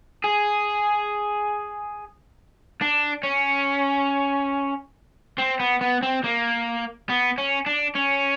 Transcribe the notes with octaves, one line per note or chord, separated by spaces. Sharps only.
G#4
D4
C#4
C4
B3
B3
C4
A#3
B3
C#4
D4
C#4